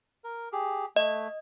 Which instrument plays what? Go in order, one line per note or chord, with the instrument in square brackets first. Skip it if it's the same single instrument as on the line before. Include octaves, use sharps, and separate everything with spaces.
[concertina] A#4
G4 G#4
[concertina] A3 [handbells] D#5